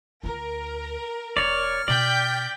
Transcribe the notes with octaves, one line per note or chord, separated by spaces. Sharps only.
D2 F4 A#4
E1 C#5 D5 F6
B2 D5 G5 G6 B6